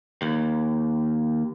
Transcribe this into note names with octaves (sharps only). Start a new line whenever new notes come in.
D#2